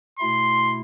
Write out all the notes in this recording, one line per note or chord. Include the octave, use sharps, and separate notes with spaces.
B2 A3 E4 C6